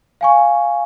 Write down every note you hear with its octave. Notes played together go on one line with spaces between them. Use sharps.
F5 G#5 C#6